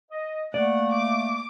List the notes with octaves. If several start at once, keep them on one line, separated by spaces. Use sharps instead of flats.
D#5
A3 A#3 D5 F#5
D6